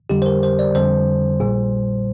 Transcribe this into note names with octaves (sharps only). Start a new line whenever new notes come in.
F2 D3 G3 G4
C5
A#4
C5
D5
F2 D3 G3 C5
A#1 A#2 G3